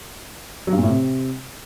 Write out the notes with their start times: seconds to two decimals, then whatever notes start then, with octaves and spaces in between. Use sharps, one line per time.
0.67 F#3
0.72 G2
0.78 A#2
0.83 A2
0.88 C3